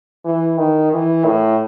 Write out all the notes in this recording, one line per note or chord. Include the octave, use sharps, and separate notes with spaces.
E3
D#3
E3
A2